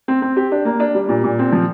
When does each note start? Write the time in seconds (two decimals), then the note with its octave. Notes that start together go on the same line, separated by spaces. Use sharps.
0.08 C4
0.22 C4
0.36 G4
0.52 D4
0.65 A#3
0.80 D4
0.95 G3
1.09 A#2
1.24 A#2
1.39 C4
1.52 F3